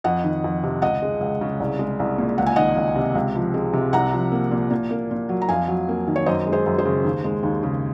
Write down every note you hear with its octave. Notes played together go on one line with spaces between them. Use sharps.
F2 D#5 F#5
D#3
F2
C3
C#2 D#5 F#5
G#3
C#2
C#3
C2
G#3
C2
A#2
C#2 F#5
G#5
D#3 D#5 F#5
C#2
C3
C#2
F3
G#3
C3
C2 F#5 A#5
F3
A#3
A#2
A#2
A#3
A#2
F#3
A#5
F2 F5 G#5
F#3
A#3
D#3
C#5
F#2 C5 D#5
G#3
G#4 C5
F#2
G#4 C5
C#3
D#2
G#3
D#2
C#3